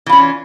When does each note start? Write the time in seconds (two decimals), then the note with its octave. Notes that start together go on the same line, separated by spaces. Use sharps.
0.06 E3
0.09 F4
0.12 C#4